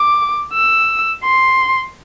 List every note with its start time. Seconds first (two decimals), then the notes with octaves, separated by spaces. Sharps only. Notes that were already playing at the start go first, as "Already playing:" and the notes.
Already playing: D6
0.54 E6
1.24 C6